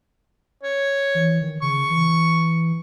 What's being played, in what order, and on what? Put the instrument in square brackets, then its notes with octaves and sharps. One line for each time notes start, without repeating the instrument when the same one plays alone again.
[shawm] C#5
[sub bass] E3
D#3
[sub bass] C#3 [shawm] C#6
[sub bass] E3